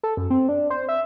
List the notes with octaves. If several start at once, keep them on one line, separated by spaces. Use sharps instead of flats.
A4
F#2
C4
D4
C5
E5